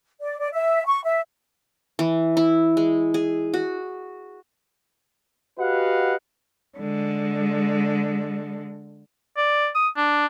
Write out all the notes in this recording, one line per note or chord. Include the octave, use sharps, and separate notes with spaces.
D5
D5
E5
C#6
E5
E3
E4
G#3
G#4
F#4
F#4 G4 B4 D#5 F5 F#5
D3 G#3
D5
D#6
D4